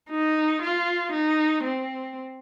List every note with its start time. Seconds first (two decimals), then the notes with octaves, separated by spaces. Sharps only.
0.10 D#4
0.62 F4
1.13 D#4
1.63 C4